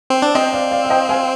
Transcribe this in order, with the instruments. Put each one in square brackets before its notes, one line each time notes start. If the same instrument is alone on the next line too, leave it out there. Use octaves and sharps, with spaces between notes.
[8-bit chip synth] C4
D4
[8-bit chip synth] C4 [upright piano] C5 D#5
[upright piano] D5 F5
D5 F5
F5
D#5 G5
F5 G#5